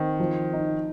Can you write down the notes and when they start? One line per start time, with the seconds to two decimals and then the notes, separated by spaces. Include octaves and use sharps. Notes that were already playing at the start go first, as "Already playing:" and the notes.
Already playing: D#3 C4
0.20 F3
0.53 D#4